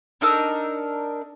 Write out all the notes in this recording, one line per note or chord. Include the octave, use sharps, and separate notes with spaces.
D4 D#4 A#4 E6